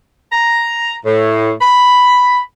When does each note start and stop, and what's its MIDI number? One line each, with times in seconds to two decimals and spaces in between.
0.32 0.95 82
1.05 1.51 45
1.61 2.40 83